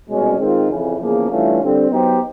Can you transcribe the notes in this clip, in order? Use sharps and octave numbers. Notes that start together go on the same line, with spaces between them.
C2 B2 G#3 C#4
D#3 G#3 C4 F4
F2 C#3 E3
E2 C#3 F3 A#3 C#4
G2 E3 A3 C#4 F4
D3 G3 C4
F#3 B3 D#4 G4 C5